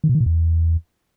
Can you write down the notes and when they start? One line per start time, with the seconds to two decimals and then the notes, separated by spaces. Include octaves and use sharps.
0.04 D#3
0.09 B2
0.15 D#3
0.20 A#2
0.26 E2